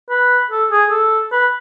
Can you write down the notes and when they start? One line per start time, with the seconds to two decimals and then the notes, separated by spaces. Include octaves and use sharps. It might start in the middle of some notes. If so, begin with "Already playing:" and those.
0.10 B4
0.51 A4
0.71 G#4
0.91 A4
1.32 B4